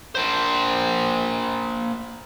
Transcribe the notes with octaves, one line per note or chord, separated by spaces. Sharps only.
A#3 C5